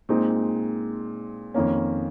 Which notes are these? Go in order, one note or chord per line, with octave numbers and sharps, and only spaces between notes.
A#2 G#3 C4 D#4
F2 D#3 A#3 C#4